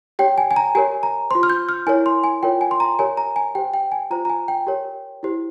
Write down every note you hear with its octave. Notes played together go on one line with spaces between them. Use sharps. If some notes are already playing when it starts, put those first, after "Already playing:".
G4 C#5 G5
G#5
G#5
A#5
G4 A#4 C#5 G#5
A#5
F4 C5 C6
F6
G6
F6
E4 A#4 C#5 G#5
C6
G#5
F4 A#4 C#5 G5
G#5
C6
A#5
G4 A#4 C#5 G#5
A#5
G#5
G4 C5 G5
G5
G#5
F4 C5 A#5
A#5
G#5
G5
G4 A#4 C#5
E4 G4 C5